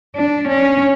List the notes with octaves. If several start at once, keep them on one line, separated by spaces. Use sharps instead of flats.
D4
C#4